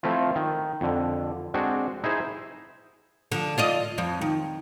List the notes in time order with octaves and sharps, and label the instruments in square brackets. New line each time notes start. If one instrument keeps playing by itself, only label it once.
[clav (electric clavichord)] F3 A3 C4 E4 F4
D#3
F2 D3
G#3 C4 D4 F#4
D#4 E4 G#4 C5
[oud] D3 F3
F4 D5 D#5
F2 F3
D#3